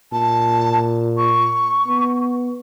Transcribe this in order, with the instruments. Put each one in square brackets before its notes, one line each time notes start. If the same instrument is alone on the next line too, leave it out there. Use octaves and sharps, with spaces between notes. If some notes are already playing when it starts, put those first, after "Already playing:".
[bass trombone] A#2 [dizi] A5
[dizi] C#6
[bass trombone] B3